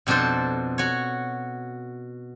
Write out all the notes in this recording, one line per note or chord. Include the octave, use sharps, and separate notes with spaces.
F2 B2 D4 A4 C5
F#4 C#5